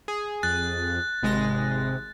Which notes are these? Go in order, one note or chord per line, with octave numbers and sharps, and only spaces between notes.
G#4
F2 F#6 A6
G#1 C3 G#3 A#6